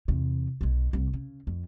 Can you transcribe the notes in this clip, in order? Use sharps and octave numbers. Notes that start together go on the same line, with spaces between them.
E2 C3
B1 G#3
C2
C#3
F2